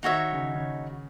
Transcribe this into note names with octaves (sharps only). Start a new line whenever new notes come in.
D#3 D#4 F#4 C#5 E5
C#3
C#3